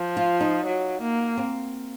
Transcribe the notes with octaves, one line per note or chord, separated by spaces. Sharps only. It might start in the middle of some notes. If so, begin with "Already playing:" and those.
Already playing: F3
F4
D#4
F#3
A#3
C4